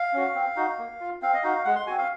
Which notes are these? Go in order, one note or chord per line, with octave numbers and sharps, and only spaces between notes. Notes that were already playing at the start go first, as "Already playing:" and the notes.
Already playing: F5
C#4 F#4
C4
D#4 F#4
A#3
F4
C4 F5
D#5
D#4 F#4 F5
G#3 F#5
C6
C4 F#4 G#5
F5